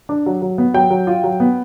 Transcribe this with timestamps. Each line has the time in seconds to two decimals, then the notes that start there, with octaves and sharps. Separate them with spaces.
0.09 D4
0.26 F#3
0.42 F#3
0.58 B3
0.74 F#3 G5
0.90 F#3
1.07 F4
1.24 F#3
1.40 B3